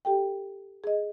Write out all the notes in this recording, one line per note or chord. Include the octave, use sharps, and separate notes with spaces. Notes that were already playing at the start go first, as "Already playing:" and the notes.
G4 A4 G5
G#4 D#5